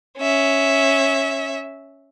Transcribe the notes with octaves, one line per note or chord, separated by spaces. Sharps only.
C#4 E5